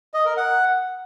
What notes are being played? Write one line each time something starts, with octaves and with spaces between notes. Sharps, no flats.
D#5
A#4
F#5